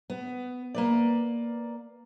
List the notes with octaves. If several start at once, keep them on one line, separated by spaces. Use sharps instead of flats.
B3
A#3 B4 D5